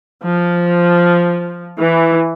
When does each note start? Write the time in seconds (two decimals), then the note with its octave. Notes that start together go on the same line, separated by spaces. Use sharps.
0.24 F3
1.79 E3